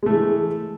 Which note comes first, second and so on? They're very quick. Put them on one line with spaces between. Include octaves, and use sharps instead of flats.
G#3 A3 E3